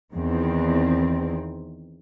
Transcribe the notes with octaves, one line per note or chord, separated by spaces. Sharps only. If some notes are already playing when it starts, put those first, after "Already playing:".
E2 D#3 C4